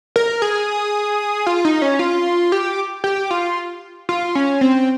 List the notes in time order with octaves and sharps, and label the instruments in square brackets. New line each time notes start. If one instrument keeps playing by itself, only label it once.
[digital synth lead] A#4
G#4
F4
D#4
C#4
F4
G4
G4
F4
F4
C#4
C4